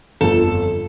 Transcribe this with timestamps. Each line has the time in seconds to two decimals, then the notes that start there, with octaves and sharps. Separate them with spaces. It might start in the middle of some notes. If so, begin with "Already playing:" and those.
0.21 G1 F2 A4